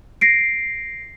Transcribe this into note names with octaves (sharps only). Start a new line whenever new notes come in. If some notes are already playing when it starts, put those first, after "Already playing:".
A#6 C7 D7